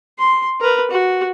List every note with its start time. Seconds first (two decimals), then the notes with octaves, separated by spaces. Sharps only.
0.19 C6
0.60 A#4 B4
0.90 F#4